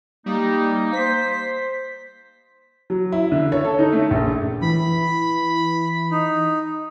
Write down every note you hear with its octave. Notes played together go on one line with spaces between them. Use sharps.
G3 A#3 D#4
C5 B6
F#3
E4
D3
C#5
A4
D#4
A3
A#1
E3 B5
D#4